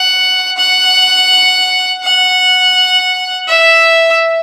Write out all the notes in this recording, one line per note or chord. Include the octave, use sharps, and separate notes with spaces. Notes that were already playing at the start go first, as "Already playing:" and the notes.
Already playing: F#5
F#5
F#5
E5